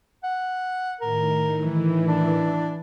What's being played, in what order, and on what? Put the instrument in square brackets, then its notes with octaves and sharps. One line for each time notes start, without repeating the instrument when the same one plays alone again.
[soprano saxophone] F#5
[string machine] A2 D#3 [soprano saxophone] A#4
[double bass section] E3
[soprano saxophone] D4